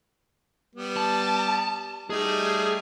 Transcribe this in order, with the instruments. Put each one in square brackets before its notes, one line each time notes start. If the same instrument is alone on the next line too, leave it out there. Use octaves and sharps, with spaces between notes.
[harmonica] G3 B3
[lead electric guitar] A5
[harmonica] G3 A3 D#4 [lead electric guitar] G#4